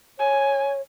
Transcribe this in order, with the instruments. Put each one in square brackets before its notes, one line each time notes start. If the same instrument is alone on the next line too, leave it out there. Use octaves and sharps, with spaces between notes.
[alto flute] C#5 [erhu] G#5